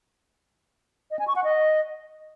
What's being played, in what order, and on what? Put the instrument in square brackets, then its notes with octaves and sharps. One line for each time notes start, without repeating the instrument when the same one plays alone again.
[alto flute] D#5
G#5
C#6
F#5
D#5